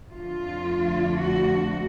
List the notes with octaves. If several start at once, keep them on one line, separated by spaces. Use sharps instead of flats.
F2 D3 F3 A3 F4
F#4